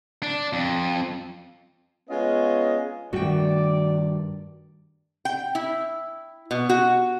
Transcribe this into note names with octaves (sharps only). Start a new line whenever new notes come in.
D4
F2
G#3 B3 C#4 F4 D#5 F5
G2 D#3 A3 F#4 D5 G5
G5
E4
B2
F#4